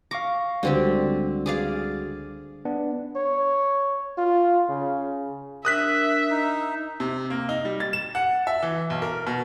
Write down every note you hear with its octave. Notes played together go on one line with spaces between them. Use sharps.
F5 C#6 D6 A#6
C#2 D3 G3 C4 F#4 G4
G#4 D5 F5
B3 D4
C#5
F4
C#3
D4 A#4 E5 D#6 F#6 B6
D#4
C3
A#3
D#4
G3
A6
E7
F#5
E5
E3
B1
A#4
B2